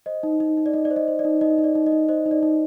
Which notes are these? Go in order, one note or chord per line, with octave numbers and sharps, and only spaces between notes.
C5 D#5
D#4
D#4
D#4
D5
D#4 D#5
D5
C5
D#5
C5
D5
D#4
D#4 D#5
D#4
D5
D#4
D#5
D#4
C5 D#5
D#4
D5
D#4